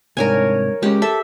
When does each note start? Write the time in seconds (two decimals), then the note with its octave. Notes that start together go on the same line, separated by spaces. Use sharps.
0.17 C2 G#2 D4 A#4 C#5 G#5
0.83 G#3 C#4 G4
1.02 A4 E5